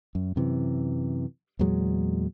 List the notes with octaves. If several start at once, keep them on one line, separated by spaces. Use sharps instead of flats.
F#2
F#2 C3 E3
E2 A#2 F#3 G#3